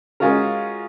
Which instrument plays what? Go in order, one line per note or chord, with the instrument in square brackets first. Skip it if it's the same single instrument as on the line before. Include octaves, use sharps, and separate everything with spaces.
[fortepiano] G#3 C#4 F4 F#4 A#4